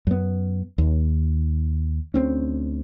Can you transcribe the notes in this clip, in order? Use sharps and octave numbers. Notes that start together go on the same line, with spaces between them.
F#2 B3
D#2
D2 C4 C#4